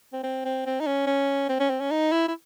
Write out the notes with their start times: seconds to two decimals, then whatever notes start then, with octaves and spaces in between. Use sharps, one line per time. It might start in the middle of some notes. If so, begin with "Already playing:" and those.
0.13 C4
0.24 C4
0.45 C4
0.66 C4
0.80 D#4
0.87 C#4
1.07 C#4
1.49 C4
1.60 C#4
1.70 C4
1.80 C#4
1.91 D#4
2.12 E4
2.28 E4